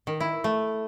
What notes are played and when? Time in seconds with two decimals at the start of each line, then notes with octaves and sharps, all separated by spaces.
0.07 D#3
0.20 E4
0.44 A3